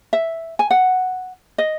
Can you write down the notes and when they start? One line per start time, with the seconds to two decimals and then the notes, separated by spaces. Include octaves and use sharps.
0.13 E5
0.59 G#5
0.71 F#5
1.58 D#5